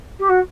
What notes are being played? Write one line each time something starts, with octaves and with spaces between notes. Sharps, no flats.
G4
F#4